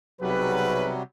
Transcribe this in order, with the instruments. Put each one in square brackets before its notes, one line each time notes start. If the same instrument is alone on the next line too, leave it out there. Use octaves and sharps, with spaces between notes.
[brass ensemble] B1 G#4 B4 [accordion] C3 F#3 G3